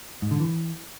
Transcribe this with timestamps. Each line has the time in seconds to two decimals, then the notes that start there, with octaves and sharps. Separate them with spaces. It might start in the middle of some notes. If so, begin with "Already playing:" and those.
0.22 G#2
0.31 D3
0.40 E3